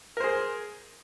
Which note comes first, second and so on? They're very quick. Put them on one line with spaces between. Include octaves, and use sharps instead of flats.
A#4 C5 G#4